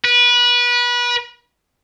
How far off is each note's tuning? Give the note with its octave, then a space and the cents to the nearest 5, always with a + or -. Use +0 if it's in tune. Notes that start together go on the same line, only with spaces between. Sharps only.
B4 -25